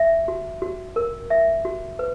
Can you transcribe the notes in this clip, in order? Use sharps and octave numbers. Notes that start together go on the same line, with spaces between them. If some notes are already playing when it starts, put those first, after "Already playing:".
Already playing: E5
F#4
F#4
A#4
E5
F#4
B4